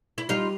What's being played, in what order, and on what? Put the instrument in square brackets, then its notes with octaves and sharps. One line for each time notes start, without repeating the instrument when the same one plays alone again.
[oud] E4
[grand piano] G3 [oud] D#4 F4